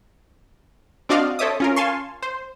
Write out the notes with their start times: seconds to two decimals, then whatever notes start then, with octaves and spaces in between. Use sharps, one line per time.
1.09 C4 D4 F#4 D5 D#5 F5
1.39 A4 C5 C#5 E5 D6 D#6
1.60 C#4 F4 A#4
1.76 F5 G#5 A5 C6 C#6
2.22 C5